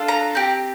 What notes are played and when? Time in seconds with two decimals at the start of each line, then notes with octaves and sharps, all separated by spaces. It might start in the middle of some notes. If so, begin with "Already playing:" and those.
Already playing: D4 F4 A4
0.08 A#5
0.35 C4 G4